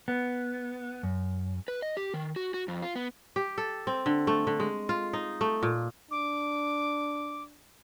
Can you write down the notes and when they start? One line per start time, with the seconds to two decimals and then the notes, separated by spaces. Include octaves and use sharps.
0.08 B3
1.03 F#2
1.68 B4
1.82 D#5
1.97 G4
2.14 D#3
2.36 F#4
2.54 F#4
2.68 F2
2.82 F4
2.95 B3
3.36 G4
3.58 A4
3.87 C4
4.06 D3
4.27 A3
4.47 D3
4.60 G#3
4.89 F4
5.13 D#4
5.41 A3
5.63 A#2
6.11 D4 D6